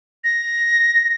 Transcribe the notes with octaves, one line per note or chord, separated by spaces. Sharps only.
A#6